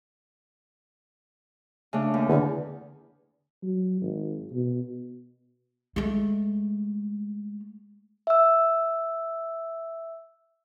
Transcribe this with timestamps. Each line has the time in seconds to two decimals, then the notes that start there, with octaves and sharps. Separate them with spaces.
1.93 C#3 A3 D4
2.14 D#2
2.29 E2 D3
3.63 F#3
4.02 G#1
4.53 B2
5.96 G#3 A3
8.27 E5 E6